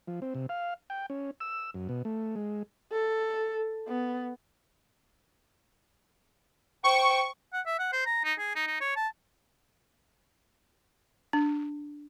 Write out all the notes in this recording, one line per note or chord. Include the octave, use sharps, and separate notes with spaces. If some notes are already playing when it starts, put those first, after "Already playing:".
F3
C4
C3
F5
G5
C#4
E6
F#2
B2
A3
G#3
A4
B3
C5 G5 C#6
F#5
E5
F#5
C5
A#5
D#4
G#4
D#4
D#4
C#5
A5
D4